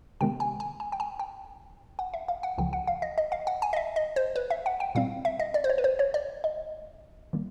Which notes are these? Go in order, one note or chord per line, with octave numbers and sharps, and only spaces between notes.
C3 D#3 G#3 B3 G5
G#5
G#5
G#5
G5
G#5
G5
F#5
E5
F5
F#5
C#2 C#3 F3 G5
F#5
F5
D#5
D#5
F5
F#5
G#5
D#5
E5
D#5
C5
B4
E5
F#5
G5
A#2 G3 C4 F5
E5
D#5
D5
C5
C#5
B4
C5
C#5
D5
D#5
D#3 G3 A#3